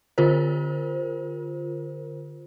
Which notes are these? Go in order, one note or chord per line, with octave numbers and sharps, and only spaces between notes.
D3 F4 A#4 C5